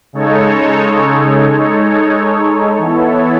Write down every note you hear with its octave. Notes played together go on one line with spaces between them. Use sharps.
C#3 G#3 D#4 A4 C#5
G#3 D#4 A4 C#5
E3 B3 E4 A4 C#5